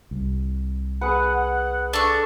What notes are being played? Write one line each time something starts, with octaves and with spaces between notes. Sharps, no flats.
C2
G#4 B4 F#5
D4 A4 C#6